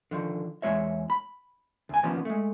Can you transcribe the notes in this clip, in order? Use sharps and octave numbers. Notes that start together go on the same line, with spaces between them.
D3 D#3 F3
E2 G#3 C#5 E5
B5
D2 G#5
D#3 F3 A#3 B3 C#4
G#3 A3